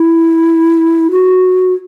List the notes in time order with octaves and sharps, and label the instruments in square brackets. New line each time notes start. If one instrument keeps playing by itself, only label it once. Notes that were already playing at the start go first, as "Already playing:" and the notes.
Already playing: [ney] E4
F#4